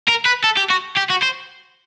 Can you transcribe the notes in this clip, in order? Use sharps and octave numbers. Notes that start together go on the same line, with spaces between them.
A#4
B4
A4
G4
F#4
G4
F#4
C5